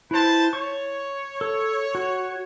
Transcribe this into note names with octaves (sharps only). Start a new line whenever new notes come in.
E4 B4 C5 A5
C#5 C#6
A4
F#4